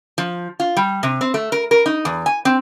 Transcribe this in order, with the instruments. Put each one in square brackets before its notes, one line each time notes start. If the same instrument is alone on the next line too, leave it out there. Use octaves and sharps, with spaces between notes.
[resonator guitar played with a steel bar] F3
F4
G3
C3
C4
A3
A#4
A#4
D#4
E2
G#5
C4